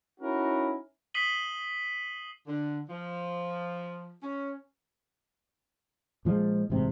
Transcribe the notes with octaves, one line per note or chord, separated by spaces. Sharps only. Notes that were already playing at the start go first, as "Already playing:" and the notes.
C#4 D#4 E4 F#4 A#4
D#6 B6 C7 D#7 F#7 G7
D3
F3
C#4
A#2 F3 G3 G#3
A1 G#2 C3